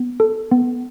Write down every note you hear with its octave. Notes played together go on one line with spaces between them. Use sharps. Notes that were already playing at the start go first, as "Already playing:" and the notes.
Already playing: B3
A4
B3